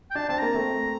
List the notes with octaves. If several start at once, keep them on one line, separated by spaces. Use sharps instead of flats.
G5
D4 A5
C4 A5
A#3 A#5
A3 C4